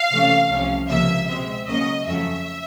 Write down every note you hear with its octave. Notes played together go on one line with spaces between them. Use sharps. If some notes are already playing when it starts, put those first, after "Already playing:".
Already playing: F5
C3 E3 A3 C#4
C2 C3 F3 A3 C#4
C#2 C3 F3 A#3 E5
B2 G#3 C4 E5
C#2 C#3 F#3 A#3 C#4 D#5
F2 C#3 F#3 A3 C#4 E5